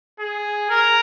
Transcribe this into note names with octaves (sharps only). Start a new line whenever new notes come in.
G#4
A#4